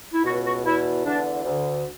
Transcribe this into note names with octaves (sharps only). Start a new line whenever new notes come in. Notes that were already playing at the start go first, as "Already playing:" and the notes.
E4
C#2 B2 F#4
F#4
E2 B2 E4
E2 D3 D4
D2 D3